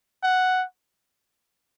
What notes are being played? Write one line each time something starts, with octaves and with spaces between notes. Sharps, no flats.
F#5